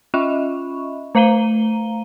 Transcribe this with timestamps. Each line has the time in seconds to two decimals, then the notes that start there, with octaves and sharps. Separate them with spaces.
0.14 C#4 F4 D#5 E5 B5 C#6
1.15 A3 C5 F5 A#5 D#7 G7